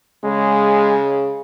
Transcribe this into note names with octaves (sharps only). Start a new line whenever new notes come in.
C#3 G#3